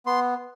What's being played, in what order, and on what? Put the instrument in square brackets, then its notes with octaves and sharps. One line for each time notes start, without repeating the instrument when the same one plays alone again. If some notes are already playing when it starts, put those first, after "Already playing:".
[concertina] B3 C6